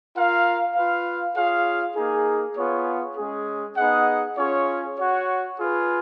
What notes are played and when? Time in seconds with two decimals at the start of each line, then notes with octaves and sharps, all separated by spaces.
0.15 F4 A#4 F5
0.75 F4 B4 F5
1.36 F4 G#4 C#5 F5
1.96 A#3 D#4 G#4
2.56 B3 F4 G#4 C#5
3.17 G#3 C#4 G#4
3.77 B3 D#4 G#4 D#5 F#5
4.37 C#4 F4 G#4 C#5
4.97 F#4 C#5 F#5
5.58 F4 G#4 B4